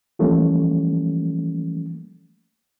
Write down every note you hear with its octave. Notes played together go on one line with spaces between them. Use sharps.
E3 F3 G3 A3 A#3 C#4